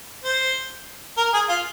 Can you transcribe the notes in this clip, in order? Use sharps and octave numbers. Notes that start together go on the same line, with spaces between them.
C5
A#4
G#4
F4